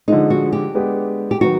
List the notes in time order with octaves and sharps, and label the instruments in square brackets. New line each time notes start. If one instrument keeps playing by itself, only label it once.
[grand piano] D3 F3 G#3 [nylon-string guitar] D#4
[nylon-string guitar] F#4
G4
[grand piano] G#3 B3 D4 G4
[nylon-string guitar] G4
[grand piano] D#3 F#3 B3 [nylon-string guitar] F#4